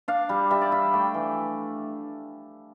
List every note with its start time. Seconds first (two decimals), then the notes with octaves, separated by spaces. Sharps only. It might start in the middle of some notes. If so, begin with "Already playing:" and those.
0.08 D4 F5
0.29 G3
0.51 G3 E5
0.61 D5
0.72 D4 E5
0.93 A3 G5
1.14 E3